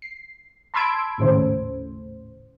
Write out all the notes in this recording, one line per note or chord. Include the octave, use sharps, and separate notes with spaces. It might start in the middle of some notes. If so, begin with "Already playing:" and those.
C7
A5 B5 C6 E6 G#6 D7
G#1 D#2 A2 C#3 C5